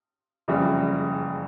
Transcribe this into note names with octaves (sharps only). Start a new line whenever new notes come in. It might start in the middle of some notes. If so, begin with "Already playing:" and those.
F#1 F2 C#3 E3 G3